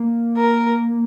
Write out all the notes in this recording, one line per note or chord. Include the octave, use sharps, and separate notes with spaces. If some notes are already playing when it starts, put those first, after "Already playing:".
Already playing: A#3
A#4